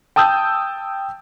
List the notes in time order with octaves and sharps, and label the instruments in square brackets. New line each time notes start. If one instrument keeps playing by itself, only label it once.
[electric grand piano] G5 A5 D#6 E6 G6